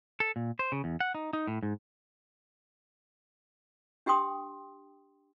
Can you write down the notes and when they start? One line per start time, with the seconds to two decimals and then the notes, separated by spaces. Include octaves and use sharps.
0.20 A4
0.36 A#2
0.59 C5
0.72 C#3
0.84 E2
1.00 F#5
1.15 D#4
1.33 D#4
1.47 A2
1.63 G#2
4.06 D4 G4 G5 C6 D#6